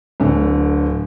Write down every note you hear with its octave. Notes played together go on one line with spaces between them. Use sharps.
D1 D3